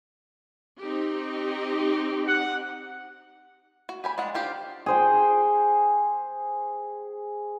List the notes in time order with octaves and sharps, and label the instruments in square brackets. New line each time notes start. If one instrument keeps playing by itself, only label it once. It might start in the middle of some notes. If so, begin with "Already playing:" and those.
[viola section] C4 D#4 G4
[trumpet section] F#5
[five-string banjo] F#4
G4 G#5 B5
G#3 D4 F#5
D4 F4 G4 C5
[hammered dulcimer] G#4 C5 G5